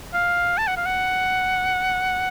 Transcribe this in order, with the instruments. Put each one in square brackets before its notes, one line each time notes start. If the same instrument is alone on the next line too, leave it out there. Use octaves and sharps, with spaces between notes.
[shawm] F5
A5
F#5
F5
F#5